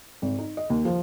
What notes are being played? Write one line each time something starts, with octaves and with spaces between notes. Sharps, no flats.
G#1
D#4
D#5
D#2
F3